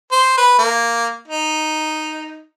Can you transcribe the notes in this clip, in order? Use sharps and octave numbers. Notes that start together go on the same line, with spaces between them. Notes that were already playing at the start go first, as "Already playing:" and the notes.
C5
B4
A#3
D#4